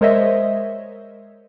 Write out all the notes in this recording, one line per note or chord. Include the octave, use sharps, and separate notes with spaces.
G#3 A#4 C5 C#5 D#5 E5